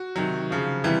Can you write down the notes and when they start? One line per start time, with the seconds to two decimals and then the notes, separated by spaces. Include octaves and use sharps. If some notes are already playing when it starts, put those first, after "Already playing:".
Already playing: F#4
0.16 C3 D#3 F#3
0.50 C#3 F3
0.84 C3 E3 G3